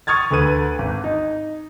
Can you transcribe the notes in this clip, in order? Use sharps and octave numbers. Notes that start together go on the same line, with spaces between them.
C#6 D#6 F6 G#6 A6
D2 A4 B4 D#7
G#1
D#4